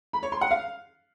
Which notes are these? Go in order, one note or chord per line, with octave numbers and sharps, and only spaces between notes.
B5
C#5
C6
F#5
F5